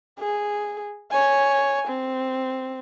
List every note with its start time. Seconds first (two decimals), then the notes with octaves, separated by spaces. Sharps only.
0.19 G#4
1.11 C#5 G#5
1.88 C4